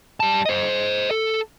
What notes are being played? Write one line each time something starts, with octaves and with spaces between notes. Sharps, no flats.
G3 A5
C5 D#5
A4